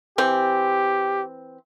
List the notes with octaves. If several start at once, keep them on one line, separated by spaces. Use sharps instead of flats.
E3 C4 G4